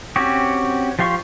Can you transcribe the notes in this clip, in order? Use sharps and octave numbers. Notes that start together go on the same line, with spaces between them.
C4 C#4 F#4 G4
F3 G4 F5 C6 C#6